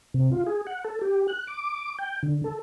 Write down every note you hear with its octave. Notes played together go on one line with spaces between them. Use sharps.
C3
F4
G#4
F#5
A4
G4
F#6
D6
G5
D3
A4